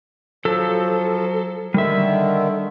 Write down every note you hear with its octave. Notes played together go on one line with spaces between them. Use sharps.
F3 F#3 A4
D3 D#3 G3 E5